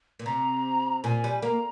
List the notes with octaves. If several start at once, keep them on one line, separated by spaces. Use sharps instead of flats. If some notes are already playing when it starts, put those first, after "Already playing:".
A#2
C3 A#5
A#2 G#5
G3
A#3 A#5